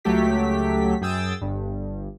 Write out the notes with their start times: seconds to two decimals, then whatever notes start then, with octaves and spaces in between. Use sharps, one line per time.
0.05 C#2 F#3 A3 G4 B6
1.02 F#2 G#4 G5 D#6 E6 A6
1.41 G1 G2